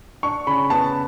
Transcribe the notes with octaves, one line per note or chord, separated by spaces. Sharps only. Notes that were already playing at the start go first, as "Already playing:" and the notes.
D4 C#6
C#3 B5
B3 A5